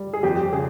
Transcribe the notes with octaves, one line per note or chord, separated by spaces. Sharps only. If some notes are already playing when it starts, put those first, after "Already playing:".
Already playing: G3
G#4
F2 G4
C#3 G#4